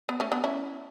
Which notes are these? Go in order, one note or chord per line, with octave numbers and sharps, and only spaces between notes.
B3
A3 C#4
B3 D4
C#4 E4